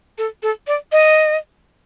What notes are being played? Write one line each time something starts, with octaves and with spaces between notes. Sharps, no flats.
A4
A4
D5
D#5